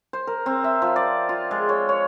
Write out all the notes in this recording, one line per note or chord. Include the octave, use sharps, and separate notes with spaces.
C5
A#4
C4
E5
F3
D5
F4
G#3
C#5
C#5